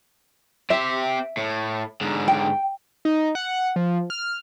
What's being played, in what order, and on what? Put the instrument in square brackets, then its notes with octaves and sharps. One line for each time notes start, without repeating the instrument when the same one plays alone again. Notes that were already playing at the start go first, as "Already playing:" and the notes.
[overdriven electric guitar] C4 G4 [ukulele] E5
[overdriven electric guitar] A2
G#2 D3
[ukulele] G5
[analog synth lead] D#4
F#5
F3
F6